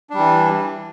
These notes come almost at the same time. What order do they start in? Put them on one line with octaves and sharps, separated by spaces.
D4 G3 E3